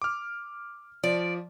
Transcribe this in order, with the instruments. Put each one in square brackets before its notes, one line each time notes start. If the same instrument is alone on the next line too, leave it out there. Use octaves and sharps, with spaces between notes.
[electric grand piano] D6 F6
[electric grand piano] F3 [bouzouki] D5